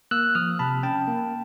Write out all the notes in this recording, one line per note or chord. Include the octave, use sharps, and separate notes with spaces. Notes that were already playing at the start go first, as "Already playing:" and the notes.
A#3 E6 F#6
F3 D#6 F6
C3 A5 B5
C#4 G5 A5
A#3